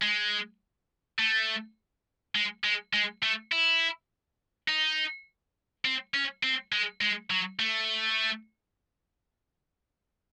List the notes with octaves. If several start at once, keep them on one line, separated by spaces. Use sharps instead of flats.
G#3
A3
G#3
G#3
G#3
A3
E4
D#4
C4
C#4
C4
G#3
G#3
F#3
A3